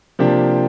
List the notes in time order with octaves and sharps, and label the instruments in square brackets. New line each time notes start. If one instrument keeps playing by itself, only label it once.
[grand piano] C3 F3 A#3 D4 G4